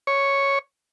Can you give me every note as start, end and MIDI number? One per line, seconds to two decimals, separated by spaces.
0.07 0.59 73